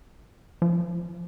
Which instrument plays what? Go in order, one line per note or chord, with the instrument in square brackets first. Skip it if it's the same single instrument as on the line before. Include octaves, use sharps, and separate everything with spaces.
[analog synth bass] F3